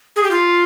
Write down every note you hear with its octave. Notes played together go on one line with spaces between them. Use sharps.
G#4
G4
F4